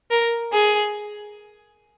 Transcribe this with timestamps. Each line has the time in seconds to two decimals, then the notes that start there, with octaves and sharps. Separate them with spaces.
0.11 A#4
0.53 G#4